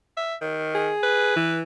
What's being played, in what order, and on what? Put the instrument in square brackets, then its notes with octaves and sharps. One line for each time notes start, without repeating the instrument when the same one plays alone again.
[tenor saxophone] E5
D#3
[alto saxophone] G#4
[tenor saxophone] B4
[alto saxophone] E3